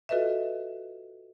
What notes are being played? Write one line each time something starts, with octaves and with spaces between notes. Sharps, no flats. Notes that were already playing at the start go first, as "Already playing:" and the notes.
F4 F#4 A4 B4 D#5 E5